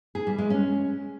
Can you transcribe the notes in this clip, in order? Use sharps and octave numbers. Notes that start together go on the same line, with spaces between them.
G#4
G3
G#3
C#4